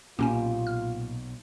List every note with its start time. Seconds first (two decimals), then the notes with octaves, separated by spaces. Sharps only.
0.19 B1 A#2 A#3 C#4 F4 G4 A#4 G#5
0.67 F6